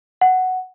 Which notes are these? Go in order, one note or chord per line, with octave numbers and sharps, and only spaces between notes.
F#5